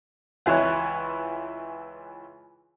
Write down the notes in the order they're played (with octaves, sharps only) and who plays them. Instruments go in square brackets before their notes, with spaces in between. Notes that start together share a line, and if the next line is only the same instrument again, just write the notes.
[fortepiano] C#2 E3 E4 C#5 F#6